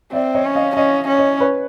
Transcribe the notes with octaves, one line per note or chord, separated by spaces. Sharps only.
C4 D5 E5
C#5 D#5
C#4
D#5 F5
C#4 D#5 F5
C#4
C#5 D#5
B4 C#5